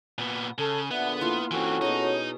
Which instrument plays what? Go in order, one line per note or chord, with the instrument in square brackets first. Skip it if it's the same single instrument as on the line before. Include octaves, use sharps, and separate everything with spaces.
[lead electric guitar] A#2 B3
[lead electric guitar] C#3 [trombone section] A4
[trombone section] A#1 D3 [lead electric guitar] B3 [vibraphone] E5 F#5
[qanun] A#3 E4 F4 [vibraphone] C6
[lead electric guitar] E3 C4 [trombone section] C#4 F#4 A4 [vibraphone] G#5
[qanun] B2 G#4 [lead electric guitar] D#4 [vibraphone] C#5